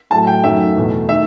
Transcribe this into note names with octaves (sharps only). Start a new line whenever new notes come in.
A2 F#3 A3 A5
G5
F#2 D#3 F#3 A3 E5
E2 B2 A3
D#3 A3 E5